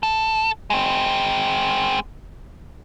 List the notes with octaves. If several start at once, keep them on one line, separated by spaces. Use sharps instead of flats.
A4
G#3 C4